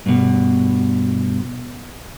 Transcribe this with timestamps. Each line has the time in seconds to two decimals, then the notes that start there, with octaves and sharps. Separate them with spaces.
0.06 G2 B2